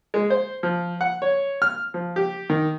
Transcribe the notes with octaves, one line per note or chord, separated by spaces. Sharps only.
G#3
C5
F3
F#5
C#5
F6
F3
G4
D#3